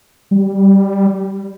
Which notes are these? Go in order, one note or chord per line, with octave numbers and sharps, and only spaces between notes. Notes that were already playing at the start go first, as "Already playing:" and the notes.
G3